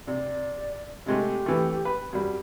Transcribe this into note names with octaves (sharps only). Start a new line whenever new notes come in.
C3 D5
C3 G#3 A3 G4
E3 A3
B4
F#2 G3